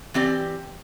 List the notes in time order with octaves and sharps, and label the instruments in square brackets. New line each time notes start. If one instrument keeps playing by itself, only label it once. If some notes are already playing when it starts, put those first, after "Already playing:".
[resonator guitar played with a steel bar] E3 C4 G4 D5